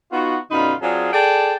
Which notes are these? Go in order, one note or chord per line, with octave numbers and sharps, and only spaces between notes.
B3 D#4 F4 F#4
F#2 B2 D3 D#4 F4 B5
F#3 C4 D4 F4 G#4
G#4 A4 D5 G5 A5